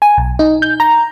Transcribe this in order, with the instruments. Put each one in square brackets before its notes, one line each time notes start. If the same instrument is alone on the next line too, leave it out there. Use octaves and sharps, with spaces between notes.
[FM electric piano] G#5
B1
D#4
G6
A#5